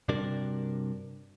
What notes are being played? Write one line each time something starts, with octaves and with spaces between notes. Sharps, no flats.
G2 C3 D4 F#4 A#4 D5